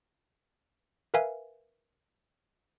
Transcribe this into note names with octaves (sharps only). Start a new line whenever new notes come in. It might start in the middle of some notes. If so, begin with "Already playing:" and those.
A#4 B4 E5 F5 G#5